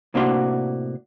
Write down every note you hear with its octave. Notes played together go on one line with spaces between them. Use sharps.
A2 C3 A#3 D4 F#4 C6